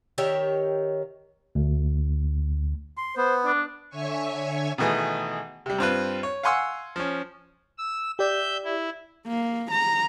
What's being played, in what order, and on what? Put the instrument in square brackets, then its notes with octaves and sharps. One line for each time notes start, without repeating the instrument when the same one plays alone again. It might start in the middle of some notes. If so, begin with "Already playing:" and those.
[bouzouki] D#3 G4 C#5 E5
[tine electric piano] D2
[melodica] C6
[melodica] B3 [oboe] C5
[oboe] D4
[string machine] D3 C#5 E5 G#5 C#6
[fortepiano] B2 D#3 E3 A3 G#4
C3 G3
G2 C4 F4 B4
C#5
F5 F#5 G#5 C6 C#6 E6
F3 C#4
[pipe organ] E6
[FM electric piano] G4 D5 [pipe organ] E5 G6
[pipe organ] E4
[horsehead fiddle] A#3
A#5